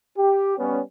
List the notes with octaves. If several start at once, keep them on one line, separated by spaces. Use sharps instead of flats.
G4
G3 B3 C#4